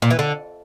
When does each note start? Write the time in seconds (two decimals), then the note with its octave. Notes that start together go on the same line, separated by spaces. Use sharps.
0.02 A#2
0.11 E3
0.19 D3